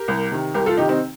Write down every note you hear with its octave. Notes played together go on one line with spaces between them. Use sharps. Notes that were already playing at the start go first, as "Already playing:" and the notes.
Already playing: G4 A#4
C2
C3 D#3
C2 G4 A#4
F4 A4
C3 D#3 D#4 G4
C4 D#4